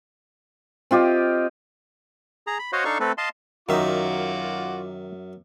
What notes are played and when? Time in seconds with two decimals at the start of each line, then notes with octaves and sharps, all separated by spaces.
0.91 C4 F4 G4 D#5
2.47 G#4 A#5
2.59 B5
2.73 F#4 C5 C#5 D#5 F5 F#5
2.85 D4 D#4 A4 F5 C#6
3.00 A3 C4 A4 B4
3.18 D#5 F5 A5 C6
3.69 F#2 D#3 D#4 F4 F#4 E5 D6